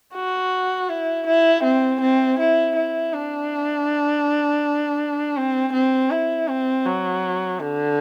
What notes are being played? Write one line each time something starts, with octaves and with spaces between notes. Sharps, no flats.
F#4
E4
E4
C4
C4
E4
E4
D4
C4
C4
E4
C4
F#3
D3